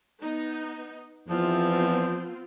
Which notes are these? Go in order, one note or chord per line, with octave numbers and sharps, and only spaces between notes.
B3 D#4
E2 F3 B3 C4 F4